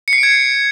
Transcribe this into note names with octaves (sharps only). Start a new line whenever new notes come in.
C#7
C7
D7
G#6